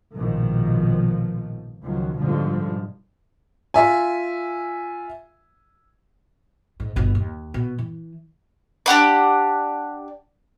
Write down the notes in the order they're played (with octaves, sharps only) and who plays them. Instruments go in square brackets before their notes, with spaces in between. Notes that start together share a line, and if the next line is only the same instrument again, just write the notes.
[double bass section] A#1 G#2 B2 D#3 F3
C#2 D#3 F3 F#3
G#2 B2 D3 F3 G3
[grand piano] F4 E5 G#5
[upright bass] G#2
G1 B2
D#2
B2
E3
[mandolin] D4 G4 F#5 B5